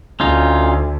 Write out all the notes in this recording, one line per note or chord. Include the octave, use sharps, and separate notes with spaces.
D2 C#4 D#4 F4